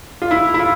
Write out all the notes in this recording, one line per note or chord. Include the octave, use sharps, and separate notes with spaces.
F4
E4
E4
F4